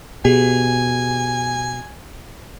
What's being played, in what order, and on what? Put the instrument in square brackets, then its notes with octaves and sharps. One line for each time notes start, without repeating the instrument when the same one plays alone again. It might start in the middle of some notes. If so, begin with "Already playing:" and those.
[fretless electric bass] B2 [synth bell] G4 G#4 [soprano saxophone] G#5